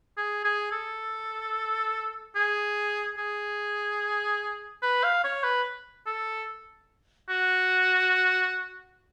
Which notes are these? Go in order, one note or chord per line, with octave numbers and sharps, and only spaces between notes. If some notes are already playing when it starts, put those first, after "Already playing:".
G#4
G#4
A4
G#4
G#4
B4
F5
C#5
B4
A4
F#4